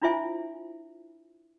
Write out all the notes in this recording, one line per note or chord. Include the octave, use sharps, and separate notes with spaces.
D4 E4 F4 C5 E5 G#5